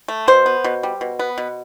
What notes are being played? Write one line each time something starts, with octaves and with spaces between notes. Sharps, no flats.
A3
B2 C5
B3
B2
G3
B2
B3
B2